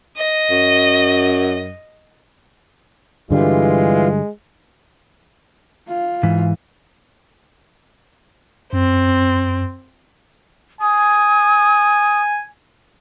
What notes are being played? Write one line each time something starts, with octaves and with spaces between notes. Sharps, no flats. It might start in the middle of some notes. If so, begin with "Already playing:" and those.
D#5
F#2
G2 D3 E3 G3 G#3 F4
F4
G#2 E3
F#2 C4
G#5 D#6